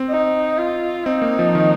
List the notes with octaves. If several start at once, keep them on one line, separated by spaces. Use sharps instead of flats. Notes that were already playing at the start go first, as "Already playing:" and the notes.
Already playing: C4
D#4
F4
C4 D#4
A#3
F3
D#3